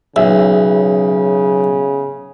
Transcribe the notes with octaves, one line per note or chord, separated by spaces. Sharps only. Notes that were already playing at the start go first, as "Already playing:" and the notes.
B1 C#3 G#4 E5